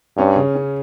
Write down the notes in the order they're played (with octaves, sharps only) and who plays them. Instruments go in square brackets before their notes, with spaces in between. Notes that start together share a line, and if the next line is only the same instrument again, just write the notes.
[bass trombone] G2 [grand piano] C#4
[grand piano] C#3
C#4